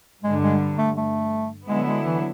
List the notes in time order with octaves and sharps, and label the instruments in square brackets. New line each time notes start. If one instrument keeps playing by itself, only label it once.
[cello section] G2 D3 G3 [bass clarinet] G#3
[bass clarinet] G#3
A3
A3
[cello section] D3 F#3 B3 E4 [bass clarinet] G#3
[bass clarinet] G#3
E3